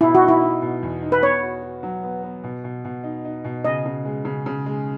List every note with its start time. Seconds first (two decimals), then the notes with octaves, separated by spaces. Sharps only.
0.01 B2 E4
0.15 F#4
0.21 D#4
0.28 E4
0.41 D#4
0.62 B2
0.83 E2
1.02 D#4
1.12 B4
1.22 B3 C#5
1.43 F#4
1.62 F#4
1.83 F#3
2.03 B3
2.23 B3
2.44 B2
2.64 B2
2.85 B2
3.04 D#4
3.25 D#4
3.44 B2
3.65 C#3 D#5
3.85 C#3
4.05 G#3
4.25 C#3
4.46 C#3
4.66 G#3